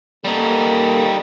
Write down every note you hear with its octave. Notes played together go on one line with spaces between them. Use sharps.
G3 A#3 D#4 A4